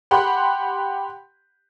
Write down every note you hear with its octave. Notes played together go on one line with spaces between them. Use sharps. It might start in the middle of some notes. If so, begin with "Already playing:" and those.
G4 F#5 B5 C6